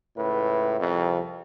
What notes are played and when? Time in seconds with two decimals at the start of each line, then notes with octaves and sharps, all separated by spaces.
0.16 C#2 A2 B4
0.80 C2 F2